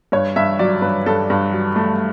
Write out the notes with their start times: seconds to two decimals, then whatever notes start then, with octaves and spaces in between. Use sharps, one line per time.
0.12 G2 C#5
0.36 G2 E5
0.59 F#3 D5
0.82 G2 B4
1.06 G2 A4
1.30 G2
1.53 F#3
1.76 A3